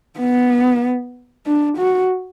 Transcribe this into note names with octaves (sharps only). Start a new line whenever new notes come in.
B3
D4
F#4